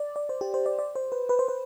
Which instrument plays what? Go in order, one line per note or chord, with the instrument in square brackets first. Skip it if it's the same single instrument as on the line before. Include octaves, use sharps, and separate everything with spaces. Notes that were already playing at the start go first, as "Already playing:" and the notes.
Already playing: [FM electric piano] D5
D5
C5
G4
C5
D5
D5
C5
B4
B4
C5
B4